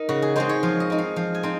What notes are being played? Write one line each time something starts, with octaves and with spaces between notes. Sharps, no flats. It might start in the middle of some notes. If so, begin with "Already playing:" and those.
Already playing: D#4 A#4
C#3 F#4
G#4
G#3 C4 D#4 C5
C#5
F3 F5
D#5
C4 D#4
F5
F3 F5
G#5
C4 D#4